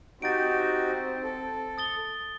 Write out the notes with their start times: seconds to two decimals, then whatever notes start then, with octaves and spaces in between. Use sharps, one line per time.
0.22 C4 D#4 F#4 G4 A6 D7
1.24 A4
1.78 D#6 A6 G7